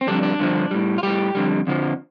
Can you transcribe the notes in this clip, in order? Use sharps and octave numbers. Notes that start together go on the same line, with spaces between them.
C4
F2 D3 G3 D4
D4
G2 D3 F3
A2 G3
F4
A2 G3 G4
F2 D3 G3
F2 D3 F3